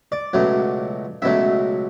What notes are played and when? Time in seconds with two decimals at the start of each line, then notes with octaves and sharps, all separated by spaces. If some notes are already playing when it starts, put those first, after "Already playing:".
0.12 D5
0.33 C#2 B2 F#3 A3
1.22 C#2 B2 F#3 A3 E5